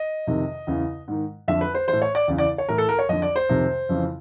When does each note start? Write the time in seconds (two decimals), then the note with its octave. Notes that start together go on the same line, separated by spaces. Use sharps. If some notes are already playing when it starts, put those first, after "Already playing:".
Already playing: D#5
0.27 F2 C3 D#3
0.67 E2 C#3 E3
1.08 G#2 D#3
1.48 F2 D3 E5
1.61 B4
1.74 C5
1.88 E3 C5
1.93 A2
2.02 C#5
2.15 D5
2.28 E2 C#3 E3
2.38 D5
2.58 C#5
2.68 A2 E3 A#4
2.78 A4
2.89 A#4
2.99 C#5
3.09 F2 D3 D#5
3.22 D5
3.36 C5
3.49 F2 C3 D#3
3.89 F2 C#3 E3